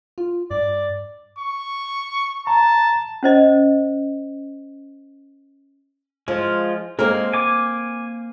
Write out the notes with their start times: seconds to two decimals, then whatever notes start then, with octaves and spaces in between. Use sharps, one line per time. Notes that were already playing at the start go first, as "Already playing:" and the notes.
0.18 F4
0.51 G2 D5
1.39 C#6
2.47 A5 A#5
3.23 C#4 C5 D#5
6.28 F3 G#3 F4
6.99 G#3 A#3 C4 A#4
7.33 G#5 D6